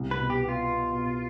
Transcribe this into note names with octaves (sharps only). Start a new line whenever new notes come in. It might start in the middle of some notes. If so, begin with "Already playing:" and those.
Already playing: C2
B4
B2
G4
B3
F4
B3
B2